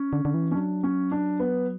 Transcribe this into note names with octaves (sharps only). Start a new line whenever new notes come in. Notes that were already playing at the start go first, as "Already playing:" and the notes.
Already playing: C#4
D3
D3
E3
C#4
F#3 D4
C#4
D4
B3